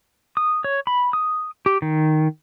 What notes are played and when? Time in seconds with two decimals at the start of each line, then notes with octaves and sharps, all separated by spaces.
0.37 D#6
0.64 C#5
0.87 B5
1.13 D#6
1.66 G4
1.82 D#3